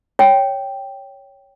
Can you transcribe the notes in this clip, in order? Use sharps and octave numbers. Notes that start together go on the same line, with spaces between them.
C#5 G5